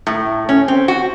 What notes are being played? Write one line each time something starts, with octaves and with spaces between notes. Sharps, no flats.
A2
C#4
C4
F#4